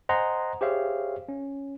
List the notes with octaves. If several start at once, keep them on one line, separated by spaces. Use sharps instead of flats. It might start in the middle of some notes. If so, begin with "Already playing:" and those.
C5 D#5 F#5 G#5 A#5 C6
G4 G#4 C5 C#5 E5 F5
C#4